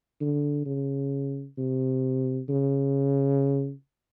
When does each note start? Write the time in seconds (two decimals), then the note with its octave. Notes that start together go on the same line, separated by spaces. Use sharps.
0.21 D3
0.66 C#3
1.58 C3
2.49 C#3